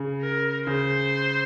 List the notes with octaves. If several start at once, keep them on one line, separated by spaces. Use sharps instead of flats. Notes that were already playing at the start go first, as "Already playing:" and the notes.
Already playing: C#3
A#4
C#3 C5